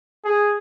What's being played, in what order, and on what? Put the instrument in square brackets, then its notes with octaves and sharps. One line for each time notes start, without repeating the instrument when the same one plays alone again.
[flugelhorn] G#4